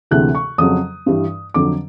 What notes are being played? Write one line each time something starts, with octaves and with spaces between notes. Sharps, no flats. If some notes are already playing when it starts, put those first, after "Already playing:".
D2 C3 E3 G#3 F#6
C#6
F2 C#3 F#3 D#6
G2 E3 G3
F2 D3 F#3 D6